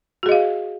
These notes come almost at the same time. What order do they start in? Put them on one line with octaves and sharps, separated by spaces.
F#4 G#4 D#5 F5